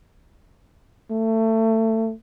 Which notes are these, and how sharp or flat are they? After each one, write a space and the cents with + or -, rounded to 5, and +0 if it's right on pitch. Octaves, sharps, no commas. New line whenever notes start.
A3 +25